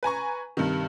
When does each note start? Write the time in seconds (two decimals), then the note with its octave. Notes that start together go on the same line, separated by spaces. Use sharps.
0.03 B4 G#5 A#5 C#6
0.57 G2 C3 D#3